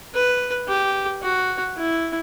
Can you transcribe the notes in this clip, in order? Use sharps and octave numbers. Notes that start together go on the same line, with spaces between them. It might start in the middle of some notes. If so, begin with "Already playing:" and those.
B4
G4
F#4
E4